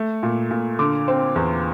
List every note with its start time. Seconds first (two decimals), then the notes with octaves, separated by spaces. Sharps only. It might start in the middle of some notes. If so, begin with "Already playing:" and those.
Already playing: A3
0.23 A#2
0.51 A#2
0.79 D3 D6
1.08 C4
1.36 E2